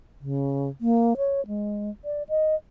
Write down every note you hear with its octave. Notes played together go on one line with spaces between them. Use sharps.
C#3
A#3
C#5
G#3
D5
D#5